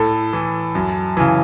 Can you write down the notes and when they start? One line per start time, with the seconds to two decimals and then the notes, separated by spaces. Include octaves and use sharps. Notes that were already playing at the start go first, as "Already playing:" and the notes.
Already playing: A2 A4
0.33 E3
0.75 F#2
1.17 C#3 E3